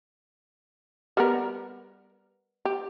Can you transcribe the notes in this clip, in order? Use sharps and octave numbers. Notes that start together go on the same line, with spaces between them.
G3 B3 A#4
G4